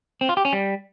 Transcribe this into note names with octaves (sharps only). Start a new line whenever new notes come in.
C4
F4
G4
C#4
G3